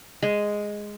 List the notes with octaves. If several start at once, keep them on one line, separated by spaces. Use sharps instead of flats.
G#3